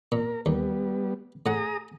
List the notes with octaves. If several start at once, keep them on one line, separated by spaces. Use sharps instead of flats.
A#2 A#4
D#2 G3 B3
A2 G#4 F#5 A#5 D#6